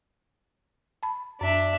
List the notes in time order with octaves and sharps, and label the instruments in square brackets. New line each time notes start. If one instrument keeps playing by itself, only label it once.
[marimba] A5 B5
[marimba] F#2 [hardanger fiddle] D4 E5